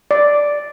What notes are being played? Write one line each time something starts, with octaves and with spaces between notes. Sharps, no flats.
D5